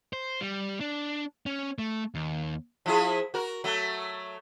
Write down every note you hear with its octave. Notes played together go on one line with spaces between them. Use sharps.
C5
G3
D4
C#4
A3
D#2
F3 E4 G#4
F#4 A#4
F#3 A3